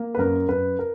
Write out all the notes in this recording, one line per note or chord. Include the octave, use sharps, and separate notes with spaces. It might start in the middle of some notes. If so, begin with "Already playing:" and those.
Already playing: A#3
B4
F#2 A#4
F#2 B4
A#4